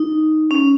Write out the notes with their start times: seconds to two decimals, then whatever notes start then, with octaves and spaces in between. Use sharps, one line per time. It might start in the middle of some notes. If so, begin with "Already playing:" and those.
Already playing: D#4
0.51 C#4